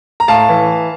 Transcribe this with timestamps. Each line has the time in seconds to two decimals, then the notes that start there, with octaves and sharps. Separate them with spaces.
0.20 A#5
0.28 A2 F5 A5
0.49 E3